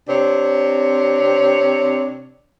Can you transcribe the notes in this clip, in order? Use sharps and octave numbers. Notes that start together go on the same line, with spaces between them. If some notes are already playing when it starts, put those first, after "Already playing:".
C3 C4 D4 C#5